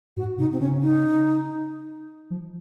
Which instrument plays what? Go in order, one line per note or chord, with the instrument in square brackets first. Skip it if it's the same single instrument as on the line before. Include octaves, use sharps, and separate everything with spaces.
[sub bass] G#2 [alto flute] F#4
[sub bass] C3 [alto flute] D#4
[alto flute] C4
[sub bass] C#3 [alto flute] C#4
[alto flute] D#4
[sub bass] F3